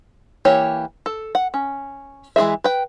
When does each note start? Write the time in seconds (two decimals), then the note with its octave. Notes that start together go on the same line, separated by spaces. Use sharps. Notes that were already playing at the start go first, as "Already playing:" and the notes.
0.45 E3 A#3 G4 C#5
1.06 A4
1.35 F#5
1.54 C#4
2.36 E3 G#3 E4 G#4 E5
2.64 B4 G5